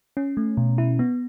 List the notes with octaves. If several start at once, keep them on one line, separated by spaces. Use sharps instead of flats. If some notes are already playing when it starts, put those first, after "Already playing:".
C#4
A3
B2
E4
B3